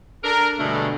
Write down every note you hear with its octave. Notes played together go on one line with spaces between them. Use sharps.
D4 A4 A#4
G2 B2 D3 G#3 A3